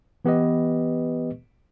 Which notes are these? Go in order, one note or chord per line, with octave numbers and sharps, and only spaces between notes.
E3 B3 G4 B4 D#5